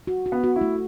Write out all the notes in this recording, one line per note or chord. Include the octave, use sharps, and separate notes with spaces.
F#4
F#4
B3
F#4
E4
A3